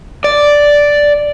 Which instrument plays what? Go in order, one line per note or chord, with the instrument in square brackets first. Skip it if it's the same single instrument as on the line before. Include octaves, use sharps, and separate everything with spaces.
[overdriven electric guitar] D5